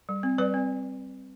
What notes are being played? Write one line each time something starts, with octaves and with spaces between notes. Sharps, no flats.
G3
C4
G3 B4 D5
C4